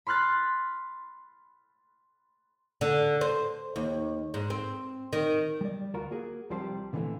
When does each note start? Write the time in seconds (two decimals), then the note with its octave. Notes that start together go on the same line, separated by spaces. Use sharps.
0.07 B5 C6 F6 F#6 A6
2.81 D3
3.21 C5
3.76 D#2
4.34 G#2
4.50 C4
5.13 D#3
5.61 G3 D5
5.94 D2 F4 F#4 A#4
6.11 A#3 F#4 G#4
6.50 C2 C3 F3 G3 G4 C5
6.93 A#2 D3 E3 G3 A3 C4